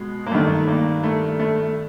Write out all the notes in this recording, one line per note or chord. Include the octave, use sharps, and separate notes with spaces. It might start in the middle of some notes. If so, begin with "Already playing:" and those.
Already playing: B2 G#3
A#3
G2 D#3 A3
A#3
A3
A3